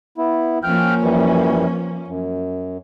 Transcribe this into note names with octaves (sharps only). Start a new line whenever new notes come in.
B3 E4
F3 A#3 C#4 G5 F6 G6
F#2 E3 G3
F#2